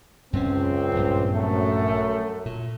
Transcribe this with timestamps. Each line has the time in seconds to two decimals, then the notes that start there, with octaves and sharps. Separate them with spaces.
0.33 C#2 F#2 C4 C#4
0.95 A#1 G2 A#2
1.33 F#2 A3
2.46 A#2